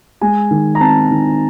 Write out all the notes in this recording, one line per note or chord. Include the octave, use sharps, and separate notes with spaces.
G#3 G#5
D#3
A#5
C4 A5
D#3